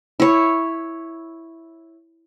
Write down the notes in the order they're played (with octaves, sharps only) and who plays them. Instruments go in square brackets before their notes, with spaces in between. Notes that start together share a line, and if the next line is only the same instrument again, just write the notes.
[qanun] E4 C#5